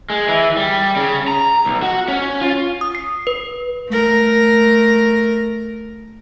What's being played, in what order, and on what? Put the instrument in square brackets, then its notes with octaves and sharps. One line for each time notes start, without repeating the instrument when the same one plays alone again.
[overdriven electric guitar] G#3
E3
G3
C#3
A#5
B1
F#4
C#4
F4
[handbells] D#6
C7
B4
[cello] A3 A#4